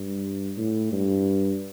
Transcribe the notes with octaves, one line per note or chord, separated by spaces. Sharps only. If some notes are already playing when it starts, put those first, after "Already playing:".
Already playing: G2
A2
G2